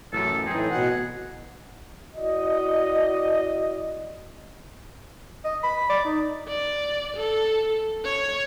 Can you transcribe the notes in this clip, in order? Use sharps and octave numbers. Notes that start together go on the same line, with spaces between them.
A1 F#2 A4
A2 E3 C4 D#4 G#4
B2 F#5
E4 F#4 D5 D#5
D#5
B5
D5
D#4
D5
A4
C#5